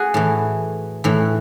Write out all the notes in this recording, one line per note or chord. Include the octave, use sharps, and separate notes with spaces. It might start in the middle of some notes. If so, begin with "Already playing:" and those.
Already playing: F#4 G#4
A2 E3
A2 E3